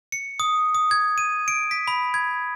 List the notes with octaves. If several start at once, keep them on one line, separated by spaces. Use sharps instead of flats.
C#7
D#6
D#6
G#6
D#7
D7
B6
B5
G#6